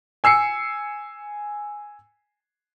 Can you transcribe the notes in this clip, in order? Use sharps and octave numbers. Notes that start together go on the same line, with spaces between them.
G#5 E6 C7 C#7